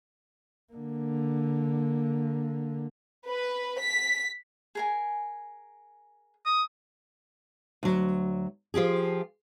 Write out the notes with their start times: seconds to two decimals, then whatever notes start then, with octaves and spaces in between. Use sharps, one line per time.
0.73 D3 A#3
3.27 B4
3.80 B6
4.75 G#4 A#4 G#5
6.46 D#6
7.83 D2 F#3
8.74 F3 F4 G4 G#4